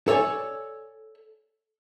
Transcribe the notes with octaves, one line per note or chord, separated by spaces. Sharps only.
A4 C#5 D5 G#5